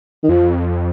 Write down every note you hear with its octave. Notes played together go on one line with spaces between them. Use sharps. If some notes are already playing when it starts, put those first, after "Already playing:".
D#3
F2 F3